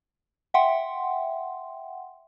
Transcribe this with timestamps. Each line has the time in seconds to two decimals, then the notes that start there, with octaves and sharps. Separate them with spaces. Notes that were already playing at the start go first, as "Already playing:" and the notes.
0.54 E5 F#5 G5 C6